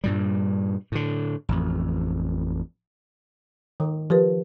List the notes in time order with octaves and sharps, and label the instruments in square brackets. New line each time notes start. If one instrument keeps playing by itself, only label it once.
[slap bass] G2 A#2 G3
A2 D3
A1 F2
[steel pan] D#3
[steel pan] F3 [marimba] G4 A#4 B4